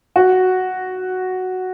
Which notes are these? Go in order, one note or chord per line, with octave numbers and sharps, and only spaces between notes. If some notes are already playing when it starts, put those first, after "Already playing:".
F#4